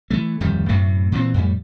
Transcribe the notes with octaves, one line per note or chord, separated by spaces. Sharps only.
E3 F#3 A3
D1 F2 D#3 G3
F#2 A2 C3 A3
A#2 E3 A#3 C4
F2 A2 G3